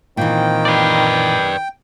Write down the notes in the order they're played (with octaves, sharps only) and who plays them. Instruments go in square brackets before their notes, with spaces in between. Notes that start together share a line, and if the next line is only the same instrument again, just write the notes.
[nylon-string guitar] A#2 E3 [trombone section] D#3 C4 [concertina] G5
[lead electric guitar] B4 D5